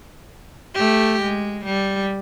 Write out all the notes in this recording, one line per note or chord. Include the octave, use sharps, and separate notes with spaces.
A3 G4
G#3
G3